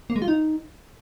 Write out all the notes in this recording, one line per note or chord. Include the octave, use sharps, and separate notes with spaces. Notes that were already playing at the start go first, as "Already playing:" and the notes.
A#3
G#3
F4
D#4